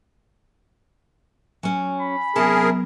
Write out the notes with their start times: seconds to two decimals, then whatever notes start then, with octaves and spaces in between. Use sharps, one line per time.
1.63 F#3 C#4 G#5
2.02 B5
2.36 C3 F#3 B3 C#4 G#4 A#4 A5